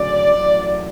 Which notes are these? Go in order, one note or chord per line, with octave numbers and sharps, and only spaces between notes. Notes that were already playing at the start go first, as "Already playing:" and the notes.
Already playing: D2 C#3 F#3 D5
A1 A2 F#3